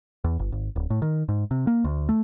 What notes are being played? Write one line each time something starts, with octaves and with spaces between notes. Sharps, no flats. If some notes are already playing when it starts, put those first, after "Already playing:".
E2
G1
G#1
D1
A2
D#3
G#2
C3
A#3
D2
A3